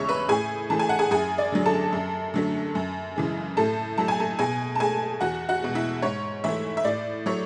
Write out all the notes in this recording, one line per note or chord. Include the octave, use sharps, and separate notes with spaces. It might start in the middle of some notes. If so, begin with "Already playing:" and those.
Already playing: E2 C#3 G#3 C#5 E5 C#6 E6
B4 B5
A2 G#4 G#5
E3 A3 A5
G#5
F#5
G#4 G#5
F#2 G#4 G#5
D5
D3 F#3
A4 A5
F#2
D3 F#3 A3
F#2
C#3 E3 G#3
A2 A4 A5
F#3 A3 A5
G#5
A4 A5
B2 G#4 G#5
A5
A3 G#4 G#5
E2 F#4 F#5
F#4 F#5
B2 G#3
E4 E5
G#2 C#5
E3 A3 E4 E5
E5
A2 D5
F#3 A3 C#5